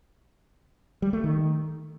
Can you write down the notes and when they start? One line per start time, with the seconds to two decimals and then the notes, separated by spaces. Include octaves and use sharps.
1.02 G3
1.13 A3
1.24 D#3